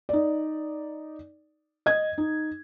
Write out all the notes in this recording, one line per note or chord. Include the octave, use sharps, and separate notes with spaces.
D#4 D5
D#5 G#6
D#4